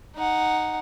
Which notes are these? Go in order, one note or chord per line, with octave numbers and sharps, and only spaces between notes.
D#4 F#5